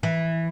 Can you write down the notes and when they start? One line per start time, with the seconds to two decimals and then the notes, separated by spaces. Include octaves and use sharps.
0.03 E3